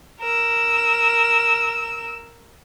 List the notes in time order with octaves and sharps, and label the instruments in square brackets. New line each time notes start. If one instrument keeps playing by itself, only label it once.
[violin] A#4 E6